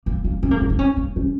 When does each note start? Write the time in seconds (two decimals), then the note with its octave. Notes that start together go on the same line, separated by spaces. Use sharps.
0.06 A#3
0.25 A#3
0.43 C#4
0.51 A#3
0.61 G#3
0.70 D#4
0.79 C#4
0.97 A#3
1.16 C#4